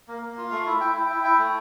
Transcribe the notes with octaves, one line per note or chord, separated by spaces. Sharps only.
A#3
A#3
F4
A3 F5
E4
E4 G5
E4
E4 G5
E4
A3